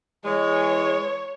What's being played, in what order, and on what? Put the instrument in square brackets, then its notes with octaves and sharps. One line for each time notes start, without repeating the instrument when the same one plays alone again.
[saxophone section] E3 G#3 [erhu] C#5